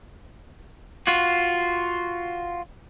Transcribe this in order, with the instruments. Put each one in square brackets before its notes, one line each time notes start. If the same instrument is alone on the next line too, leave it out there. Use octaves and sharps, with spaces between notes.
[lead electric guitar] F4 F#4